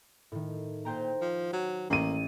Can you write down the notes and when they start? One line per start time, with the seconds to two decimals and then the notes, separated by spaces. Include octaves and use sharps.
0.32 A2 D#3
0.85 A#2 C5 G5 A#5
1.21 F3
1.53 F#3
1.90 A1 A#3 D#7